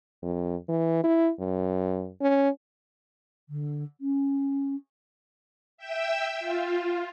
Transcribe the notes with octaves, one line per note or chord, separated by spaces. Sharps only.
F2
E3
E4
F#2
C#4
D3
C#4
E5 G5 E6
F4